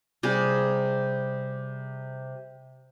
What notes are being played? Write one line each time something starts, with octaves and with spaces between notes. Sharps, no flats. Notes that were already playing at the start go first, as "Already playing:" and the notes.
C3 G3 G#4